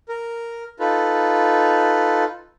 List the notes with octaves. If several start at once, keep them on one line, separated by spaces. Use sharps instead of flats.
A#4
D#4 F4 A4 B4